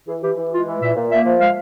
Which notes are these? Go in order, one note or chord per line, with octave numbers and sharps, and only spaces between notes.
E3 G#4
E3 G4
E3
G#3 F4
E3
A#2 E5
A#2
A#3 E5
F3
G#3 F5